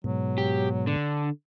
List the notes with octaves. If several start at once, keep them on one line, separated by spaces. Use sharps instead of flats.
G#2 B2 F#3
G4
D3 D4